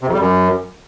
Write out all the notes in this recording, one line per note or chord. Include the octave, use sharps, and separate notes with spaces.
C3
F2
G3
F#2